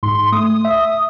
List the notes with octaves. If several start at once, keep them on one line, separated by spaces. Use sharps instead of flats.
G#2 C6
A3 D#6
E5